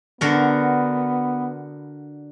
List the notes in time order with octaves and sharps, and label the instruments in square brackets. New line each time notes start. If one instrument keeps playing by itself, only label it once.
[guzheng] D3 F#4 A#4 [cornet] B3